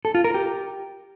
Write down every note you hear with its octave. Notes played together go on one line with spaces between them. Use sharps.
A4
F4
A#4
G4